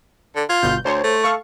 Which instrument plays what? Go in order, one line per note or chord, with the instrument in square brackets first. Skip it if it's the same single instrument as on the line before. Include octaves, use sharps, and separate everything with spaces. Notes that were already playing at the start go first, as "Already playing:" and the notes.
[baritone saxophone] D3
[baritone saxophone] F4 [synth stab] G#6
[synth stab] G1 B2 G6
[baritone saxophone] D2 [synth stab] C5 C#5
[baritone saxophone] A3
[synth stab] A4 F5 C#6